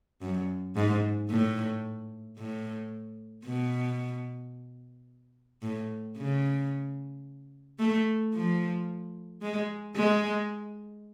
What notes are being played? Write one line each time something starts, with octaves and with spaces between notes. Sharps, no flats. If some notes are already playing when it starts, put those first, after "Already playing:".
F#2
G#2
A2
A2
B2
A2
C#3
A3
F3
G#3
G#3